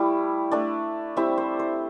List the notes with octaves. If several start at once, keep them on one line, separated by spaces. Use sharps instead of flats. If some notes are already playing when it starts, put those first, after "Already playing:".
Already playing: G3 A3 E4
A3 D4 D5
G3 C4 E4 E5
C5
C5